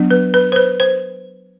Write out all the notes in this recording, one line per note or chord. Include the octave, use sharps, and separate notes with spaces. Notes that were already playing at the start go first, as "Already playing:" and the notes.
Already playing: F#3 B3 D4
B4
B4
C5
B4
C5